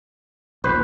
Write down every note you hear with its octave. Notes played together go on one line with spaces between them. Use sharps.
A#1 D#2 B4 C5